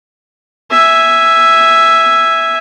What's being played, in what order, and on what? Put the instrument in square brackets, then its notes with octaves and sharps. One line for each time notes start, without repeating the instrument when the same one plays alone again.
[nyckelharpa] E5 G#5